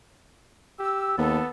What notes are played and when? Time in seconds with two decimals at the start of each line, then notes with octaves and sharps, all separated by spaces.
0.79 G4 E6
1.18 D#2 B3 A4